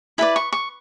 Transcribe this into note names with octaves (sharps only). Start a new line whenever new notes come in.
E4 B4 D5 B5
C#6
C#6